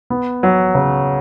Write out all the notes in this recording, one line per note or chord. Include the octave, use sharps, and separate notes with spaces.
B3
F#3
C#3